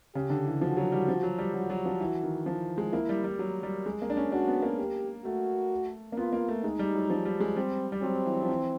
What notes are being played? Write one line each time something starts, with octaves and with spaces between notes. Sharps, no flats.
C#3 G4
D3
E3
F3 F#4
F#3
G3
F3
F#3
G3
F#3 F#4
F#3
F3
E3
D#3
F3
G#3
A#3 E4
G3
G3
F#3
G3
G#3
A#3
D4
C#4
D4 F#4
B3
A#3
G4
A3 F#4
A#3
B3 F4
A#3
A3
G#3 D#4
G3
F#3
F3
G3
G#3
G3 C4
G3
F#3 C4
E3
F3
E3